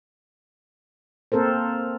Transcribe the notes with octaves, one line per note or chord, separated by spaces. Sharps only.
A#3 C4 A4 A#4 C5